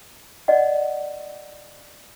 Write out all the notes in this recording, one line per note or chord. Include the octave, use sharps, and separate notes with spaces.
D5 D#5 F#5